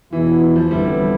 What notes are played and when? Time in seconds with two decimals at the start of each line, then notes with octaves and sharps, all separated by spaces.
0.12 E2 B2 E3 B3 E4
0.42 E3
0.56 F3
0.70 G1 F2 E3 G3 B3 E4
0.85 G3
1.00 F3